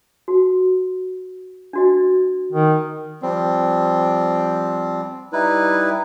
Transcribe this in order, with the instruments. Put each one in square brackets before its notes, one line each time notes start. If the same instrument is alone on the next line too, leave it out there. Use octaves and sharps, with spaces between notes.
[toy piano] F#4
D4 F#4 D#5
[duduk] D#3
[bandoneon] F3 G3 C4
G3 D#4 E4 B4